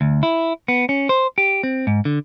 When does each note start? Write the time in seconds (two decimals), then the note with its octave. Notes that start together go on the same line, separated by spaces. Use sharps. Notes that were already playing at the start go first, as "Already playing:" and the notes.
0.01 D2
0.23 E4
0.68 B3
0.89 C#4
1.09 C5
1.38 G4
1.63 C4
1.87 G#2
2.05 D3